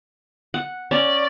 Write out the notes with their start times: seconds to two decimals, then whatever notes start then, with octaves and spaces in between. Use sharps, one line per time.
0.54 F#5
0.91 C#4 D5